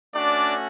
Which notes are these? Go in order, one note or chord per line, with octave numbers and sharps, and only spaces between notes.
A3 C#4 D4 F#4 D5